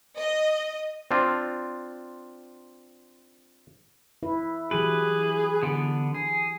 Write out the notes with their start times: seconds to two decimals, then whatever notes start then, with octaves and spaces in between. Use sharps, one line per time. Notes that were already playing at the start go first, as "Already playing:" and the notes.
0.18 D#5
1.11 C4 D4 F4
4.23 E4 B4
4.71 E3 F#3 G4 G#4 B4
5.63 D3 B3
6.14 G#4